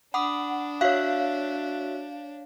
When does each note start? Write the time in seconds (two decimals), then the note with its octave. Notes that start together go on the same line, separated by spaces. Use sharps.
0.14 D4 F#5 B5 D6 D#6
0.81 F#4 C#5 E5 F5 F#6